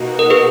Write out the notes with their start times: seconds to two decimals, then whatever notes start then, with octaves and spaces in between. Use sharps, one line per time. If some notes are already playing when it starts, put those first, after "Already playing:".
Already playing: B2 A#3 D#4 F#4
0.19 A#4
0.30 G#4 B4